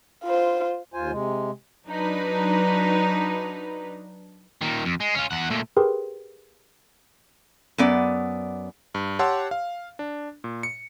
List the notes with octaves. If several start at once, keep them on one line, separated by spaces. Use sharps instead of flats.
F4 C5
D#2 F4 C5 G#5
C3 G#3
F#3 D4 D#4 B4
A#2 D#3
F2
G#3
C#4 F4
E2 F#5
A#2 A3
G4 G#4 A#4 B4 G5 C6
F#2 B3 D5
G2
G4 C#5 F#5 A5 C6 E6
F5
D4
A#2
C#7